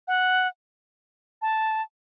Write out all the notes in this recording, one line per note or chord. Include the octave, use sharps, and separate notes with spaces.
F#5
A5